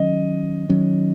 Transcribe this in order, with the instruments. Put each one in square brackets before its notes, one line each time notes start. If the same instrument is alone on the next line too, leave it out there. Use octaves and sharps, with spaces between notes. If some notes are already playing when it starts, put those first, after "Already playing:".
Already playing: [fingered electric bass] D#3 F#3 C#4 [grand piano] D#5
[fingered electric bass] D#3 F#3 C#4